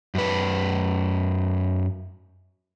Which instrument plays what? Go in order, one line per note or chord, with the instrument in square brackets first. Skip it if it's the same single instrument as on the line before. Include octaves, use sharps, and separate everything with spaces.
[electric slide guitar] F#2 B4